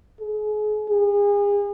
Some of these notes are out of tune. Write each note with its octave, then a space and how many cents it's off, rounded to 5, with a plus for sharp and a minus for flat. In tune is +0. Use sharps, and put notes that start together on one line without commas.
G#4 +35
G#4 -35